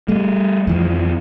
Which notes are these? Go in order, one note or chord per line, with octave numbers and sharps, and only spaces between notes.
G3 A3
F2 E3 F3